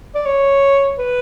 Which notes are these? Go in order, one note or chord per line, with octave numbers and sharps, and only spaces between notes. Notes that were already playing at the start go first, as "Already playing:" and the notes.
D5
C#5
B4